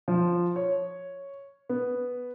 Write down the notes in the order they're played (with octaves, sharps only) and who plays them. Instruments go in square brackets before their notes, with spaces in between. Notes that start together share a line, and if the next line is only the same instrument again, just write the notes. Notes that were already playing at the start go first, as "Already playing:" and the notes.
[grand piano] F3
C#5
B3